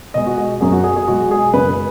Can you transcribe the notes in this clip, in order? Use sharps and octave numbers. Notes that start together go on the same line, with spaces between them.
B2 G#3 D#5
F#4
G#4
F#2 F#3 G#4
F#4
G#4
G#4
B2 G#3 F#4
G#4
F#2 C#3 G#3 B4
B4